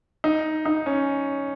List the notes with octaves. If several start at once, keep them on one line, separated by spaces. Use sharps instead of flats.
D#4
D#4
C#4